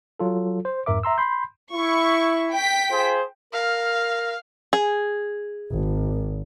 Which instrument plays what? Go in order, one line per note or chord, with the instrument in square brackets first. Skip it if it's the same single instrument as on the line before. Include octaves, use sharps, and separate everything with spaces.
[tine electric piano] F#3 F4 A4
C5
F2 G#2 A#4 E5 D6
E5 A#5 C6 E6
B5 C6 G6
[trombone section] E4 [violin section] C#6
[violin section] G5 B6
[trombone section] F4 G#4 C5
[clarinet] A#4 [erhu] F5
[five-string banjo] G#4
[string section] G#1